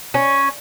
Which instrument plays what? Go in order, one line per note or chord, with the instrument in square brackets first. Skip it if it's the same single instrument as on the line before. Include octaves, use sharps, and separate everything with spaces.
[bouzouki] C#4